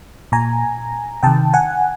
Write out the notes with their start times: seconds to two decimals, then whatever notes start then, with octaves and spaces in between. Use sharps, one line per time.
0.32 A#2 G#5 A#5
1.23 C3 D#3 G5 A5
1.53 F#5 G#5